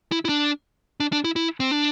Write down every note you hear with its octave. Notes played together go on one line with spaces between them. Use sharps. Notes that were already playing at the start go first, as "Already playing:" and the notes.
E4
E4
D4
D4
D4
E4
E4
C4
D4